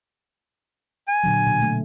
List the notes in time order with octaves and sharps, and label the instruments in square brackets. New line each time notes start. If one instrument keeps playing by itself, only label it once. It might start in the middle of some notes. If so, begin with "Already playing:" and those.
[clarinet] G#5
[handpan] A#2 D3 F#3
B2
A3